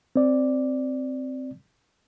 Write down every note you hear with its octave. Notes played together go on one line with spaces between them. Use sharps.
C4 D5